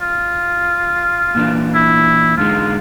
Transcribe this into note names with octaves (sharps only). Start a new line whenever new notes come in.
F4
A#2 E3 D4
E4
G#2 D3 G#3 F4